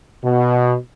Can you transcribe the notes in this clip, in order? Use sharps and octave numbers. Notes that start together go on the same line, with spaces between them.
B2